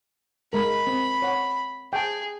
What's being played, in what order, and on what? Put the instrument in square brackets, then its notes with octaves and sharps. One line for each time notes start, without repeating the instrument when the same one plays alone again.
[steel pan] G#3 A#4 [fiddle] B5
[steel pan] C4
C#5 F#5
[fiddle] G#4 [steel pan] G5 A5